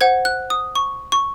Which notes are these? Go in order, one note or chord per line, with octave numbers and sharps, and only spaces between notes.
C5 F#5 G#6
F#6
D#6
C#6
C#6